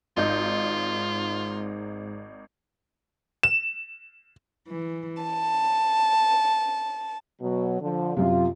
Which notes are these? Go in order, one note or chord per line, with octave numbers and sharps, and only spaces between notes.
G#1 G#2 D#4 F4 G6
E7
E3
A5
B2 F#3
D3 F3
F#2 C3 F4